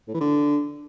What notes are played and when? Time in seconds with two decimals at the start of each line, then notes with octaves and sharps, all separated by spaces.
0.08 A2
0.14 E3
0.21 D3